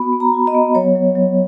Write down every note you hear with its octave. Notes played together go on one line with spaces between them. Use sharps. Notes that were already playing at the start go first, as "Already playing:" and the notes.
Already playing: B3 F#4 B5
B3
A#5
F#4
D#5
B3
F#3 C#5
F#3
F#3